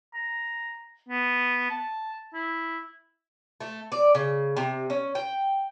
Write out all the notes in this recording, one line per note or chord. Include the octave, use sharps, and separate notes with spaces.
A#5
B3
A5
E4
A3
D5
C#3
C3
C#4
G5